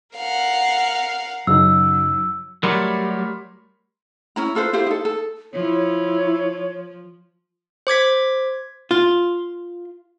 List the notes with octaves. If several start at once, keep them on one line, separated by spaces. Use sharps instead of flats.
A#4 F5 F#5
F#2 C#3 F#3 D#4 E6
F#3 G3 A3 A#4 B5 C6
C#4 E4 A#5
F4 A4 B4 C5
E4 G4 C5 F5
D#4 A4
A4
F3 E4 C#5
C5 D6 G#6 B6
F4